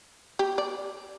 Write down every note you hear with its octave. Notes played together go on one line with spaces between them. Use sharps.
G4
D5